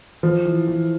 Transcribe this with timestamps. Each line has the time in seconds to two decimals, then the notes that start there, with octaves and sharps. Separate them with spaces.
0.23 F3
0.45 E3
0.68 E3